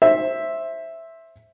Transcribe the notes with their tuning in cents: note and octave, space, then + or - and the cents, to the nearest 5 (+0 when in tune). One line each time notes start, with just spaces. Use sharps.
C5 +20 E5 +0